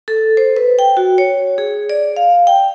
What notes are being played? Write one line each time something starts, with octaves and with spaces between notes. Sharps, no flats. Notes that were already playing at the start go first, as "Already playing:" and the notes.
A4
C5
B4
G5
F#4
C#5
G#4
D5
F5
G5